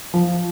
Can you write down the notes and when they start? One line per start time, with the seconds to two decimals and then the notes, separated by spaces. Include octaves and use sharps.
0.14 F3